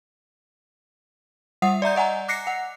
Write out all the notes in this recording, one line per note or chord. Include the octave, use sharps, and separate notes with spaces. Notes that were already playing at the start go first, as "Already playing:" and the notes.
G3 E5 F#5 D#6 C7
D5 E5 A#5 G6
D5 D#5 F#5 G#5 A#5
D6 F#6 A#6 C7 C#7
F#5